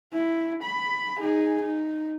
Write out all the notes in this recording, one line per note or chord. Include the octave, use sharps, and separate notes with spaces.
E4
B5
D#4 G#4
D#4